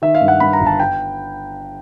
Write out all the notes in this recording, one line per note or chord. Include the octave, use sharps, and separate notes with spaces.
D#3 E5
F5
G2
F#5
G2 B5
A#5
G1
A5
G5